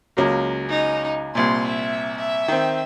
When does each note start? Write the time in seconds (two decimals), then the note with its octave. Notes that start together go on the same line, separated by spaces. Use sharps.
0.17 C#2 F#3 A#3
0.66 C#4 D#4
1.35 C2 A#2 C6
1.66 E5
2.17 E5
2.48 D#3 C4